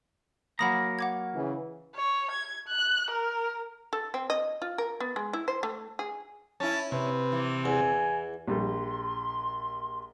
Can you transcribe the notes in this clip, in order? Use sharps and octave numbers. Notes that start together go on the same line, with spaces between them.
F#3 A#3 F#5 A#5 B5 D#6
F#5 D6 G#6
C#3 E3
C#5
G#6
F#6
A#4
A4
C4
D#5
F4
A#4
B3
G#3
E4
C5
A3
G#4
C#4 E4 A5
C3 B4
E3
E2 G#5
A#1 G3 C6